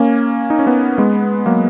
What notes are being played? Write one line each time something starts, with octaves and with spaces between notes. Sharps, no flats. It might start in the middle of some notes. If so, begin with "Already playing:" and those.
Already playing: A#3 C#4
D#4
C#4
B3 D#4
G#3 B3
F#3 A#3